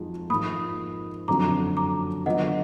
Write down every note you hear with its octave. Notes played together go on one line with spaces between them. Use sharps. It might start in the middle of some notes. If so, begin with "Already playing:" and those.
Already playing: F2 F3 G#3 D#4 F#4
G#2 F3 A#3 B5 D#6
F#1 F2 D3 F#3 A#5 D6
A#5 D6
D3 F#3 B3 F4 D#5 F#5